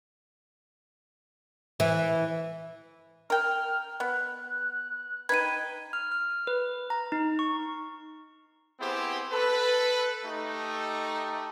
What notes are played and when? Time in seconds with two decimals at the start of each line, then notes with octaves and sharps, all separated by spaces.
1.80 E3
3.30 A#4 G5 F6
4.00 B3 F#6
5.29 D#4 B4 G5 G#6 D#7
5.93 F6
6.12 F6
6.47 B4
6.90 A#5
7.12 D#4
7.39 C#6
8.80 B3 C4 E4 G4 G#4 C5
9.31 A4 B4
10.24 A3 D#4 G4